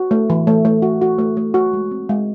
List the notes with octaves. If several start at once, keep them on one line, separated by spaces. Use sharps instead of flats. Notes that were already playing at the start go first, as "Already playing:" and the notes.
Already playing: F#4
A3
E3
A3
A3
F#4
F#4
A3
A3
F#4
G#3
C4
G#3